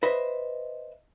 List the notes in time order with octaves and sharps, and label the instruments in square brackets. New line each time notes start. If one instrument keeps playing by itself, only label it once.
[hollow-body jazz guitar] B4 C5 D#5 E5